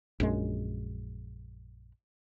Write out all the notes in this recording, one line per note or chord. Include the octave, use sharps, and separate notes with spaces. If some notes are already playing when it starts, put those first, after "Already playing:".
A#1 F#2 G#3